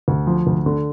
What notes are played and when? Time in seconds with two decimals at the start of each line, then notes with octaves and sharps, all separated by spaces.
0.08 D2
0.27 F3
0.47 D2
0.66 D3